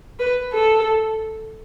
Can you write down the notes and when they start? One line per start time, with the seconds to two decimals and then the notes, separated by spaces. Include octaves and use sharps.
0.19 B4
0.53 A4